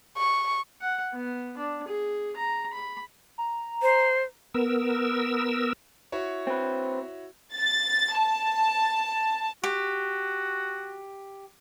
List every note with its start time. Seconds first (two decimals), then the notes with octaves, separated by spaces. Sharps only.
0.18 C#6
0.81 F#5
1.13 B3
1.57 D4
1.87 G#4
2.36 A#5
2.73 B5
3.38 A#5
3.82 C5
4.54 B3 A#4 E6
6.12 E4 F#4 C#5
6.47 C4 B4
7.54 A6
8.18 A5
9.64 F#4 G4